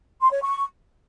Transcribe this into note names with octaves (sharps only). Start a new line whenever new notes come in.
C6
C#5
C#6